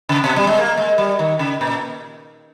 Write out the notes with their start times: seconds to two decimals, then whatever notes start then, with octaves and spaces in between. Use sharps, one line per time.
0.09 C#3
0.24 B2
0.36 G3
0.47 G#3
0.58 A#3
0.77 G#3
0.98 G3
1.19 D#3
1.39 C#3
1.61 A#2